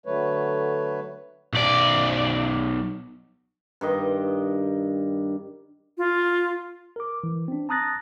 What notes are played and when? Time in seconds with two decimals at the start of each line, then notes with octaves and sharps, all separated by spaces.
0.06 D3 F#3 A3 B4 C#5
1.54 B1 D5
3.81 G2 D#3 D#5
5.98 F4
6.96 A#4 D6
7.24 E3
7.48 C4 D4
7.69 A5 A#5 D#6 F#6 A6 A#6